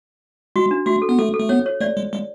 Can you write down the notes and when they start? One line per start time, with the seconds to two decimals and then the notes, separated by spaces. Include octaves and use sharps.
0.56 G#3 F#4
0.71 D4
0.86 A3 F#4
1.02 A4
1.09 B3
1.19 A3 A4
1.34 A4
1.40 A3
1.49 B3 C#5
1.66 C#5
1.81 A3 D5
1.97 G#3
2.13 G#3